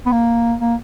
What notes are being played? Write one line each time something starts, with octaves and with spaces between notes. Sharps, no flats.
B3
A#3
A#3